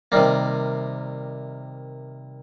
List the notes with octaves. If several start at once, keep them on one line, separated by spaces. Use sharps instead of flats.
C3 D#3 G3 A#3